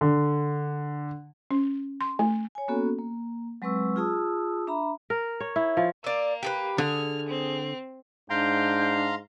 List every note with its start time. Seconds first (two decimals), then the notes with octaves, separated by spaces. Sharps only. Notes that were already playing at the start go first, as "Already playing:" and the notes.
0.01 D3
1.51 C#4
2.01 C6
2.19 A3
2.55 C#5 G#5
2.68 A#3 B3 C#4 F#4 A4
2.98 A#3
3.62 F#3 G#3 C4 B4 C#6 E6
3.96 F4 G#4 A5 D#6 E6
4.67 D4 E5 A#5 B5
5.10 A#4
5.40 C#5
5.56 E4
5.77 F3
6.04 A#3 D5 E5
6.43 G4 G#4 B4
6.78 D3 G#4 F6
7.28 C4
8.30 G#2 D4 F5 G5 A#5 C6